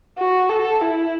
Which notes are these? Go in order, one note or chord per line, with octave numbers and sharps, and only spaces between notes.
F#4
A4
E4